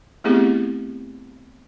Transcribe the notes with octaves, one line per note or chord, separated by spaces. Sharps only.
A3 B3 C4 E4 G4 G#4